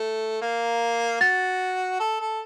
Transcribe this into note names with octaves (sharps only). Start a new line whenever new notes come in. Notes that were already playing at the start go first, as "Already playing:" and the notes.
Already playing: A3
A#3
F#4 A6
A4
A4